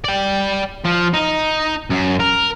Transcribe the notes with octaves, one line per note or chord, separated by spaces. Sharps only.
D5 G5
F3
D#4
F#2
A#4